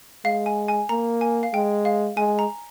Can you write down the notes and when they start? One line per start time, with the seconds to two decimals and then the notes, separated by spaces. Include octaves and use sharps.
0.25 G#3 F5
0.46 G#5
0.68 G#5
0.89 A#3 A#5
1.21 G#5
1.43 F5
1.54 G#3 G5
1.85 F5
2.17 G#3 G#5
2.39 A#5